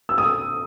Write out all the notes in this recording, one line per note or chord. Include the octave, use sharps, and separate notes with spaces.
E6
D#6